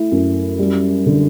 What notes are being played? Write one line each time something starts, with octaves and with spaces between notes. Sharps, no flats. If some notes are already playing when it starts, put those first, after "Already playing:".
Already playing: A3 E4
F#2
G3
D3